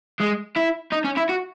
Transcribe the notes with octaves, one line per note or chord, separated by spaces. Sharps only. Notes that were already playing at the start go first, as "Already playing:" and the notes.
G#3
E4
D#4
C#4
E4
F#4